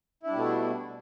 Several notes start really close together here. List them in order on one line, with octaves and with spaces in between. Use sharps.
E4 D4 G3 B2 A3